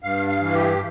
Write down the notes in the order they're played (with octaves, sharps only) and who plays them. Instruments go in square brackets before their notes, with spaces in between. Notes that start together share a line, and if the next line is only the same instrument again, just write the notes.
[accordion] G2 F5
F5
E3
G4